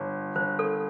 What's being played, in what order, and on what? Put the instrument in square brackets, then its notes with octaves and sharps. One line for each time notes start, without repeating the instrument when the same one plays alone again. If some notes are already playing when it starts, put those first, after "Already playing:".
Already playing: [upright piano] G1
[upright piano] G1 [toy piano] C5
[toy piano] A4